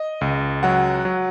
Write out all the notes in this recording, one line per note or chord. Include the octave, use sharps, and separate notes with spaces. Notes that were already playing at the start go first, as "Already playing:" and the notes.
Already playing: D#5
C#2
F#3 F#5
F#3